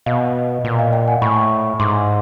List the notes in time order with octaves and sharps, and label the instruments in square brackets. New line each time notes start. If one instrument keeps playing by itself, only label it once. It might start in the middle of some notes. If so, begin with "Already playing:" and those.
[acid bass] B2 [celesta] D#5 F5
[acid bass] A#2
[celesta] D#5 F5
F5 G5
F#5 G#5
[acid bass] A2 [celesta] B5 C#6
[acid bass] G#2 [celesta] C6 D6